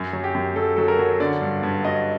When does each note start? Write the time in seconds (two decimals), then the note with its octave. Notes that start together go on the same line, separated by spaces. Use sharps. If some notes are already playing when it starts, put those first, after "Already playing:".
Already playing: F#2
0.13 F#3
0.24 G4
0.35 F#2
0.56 F#3 A4
0.76 F#3 A4
0.88 A#4
0.99 F#3
1.20 D3 D5
1.42 G2
1.63 G2
1.84 F#3 D#5